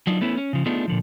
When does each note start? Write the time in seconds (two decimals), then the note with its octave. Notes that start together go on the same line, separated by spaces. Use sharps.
0.07 F#3 D4 D#4 F4
0.21 A3 B3 C#4 E4
0.37 C#4
0.53 C#3 F3
0.66 A3 B3 D4 D#4 F4 G#4
0.88 A#2 D3 F3